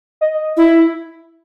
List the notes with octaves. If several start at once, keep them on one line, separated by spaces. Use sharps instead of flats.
D#5
E4